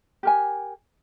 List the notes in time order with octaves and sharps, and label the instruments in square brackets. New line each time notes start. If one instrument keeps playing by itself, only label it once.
[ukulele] G4 A#4 G#5